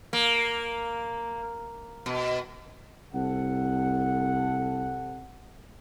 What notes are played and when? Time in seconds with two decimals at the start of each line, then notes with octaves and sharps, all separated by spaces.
0.13 A#3
2.06 B2
3.14 C2 C3 A4 F#5